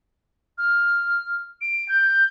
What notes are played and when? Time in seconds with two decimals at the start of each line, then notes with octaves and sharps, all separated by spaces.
0.58 F6
1.61 D7
1.88 G6